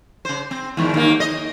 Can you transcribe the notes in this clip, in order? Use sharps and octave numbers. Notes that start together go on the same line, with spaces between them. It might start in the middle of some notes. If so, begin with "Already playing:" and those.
C#3 C5
C4
E2 G#2 D#3
D#2 D#3 A#3
D#5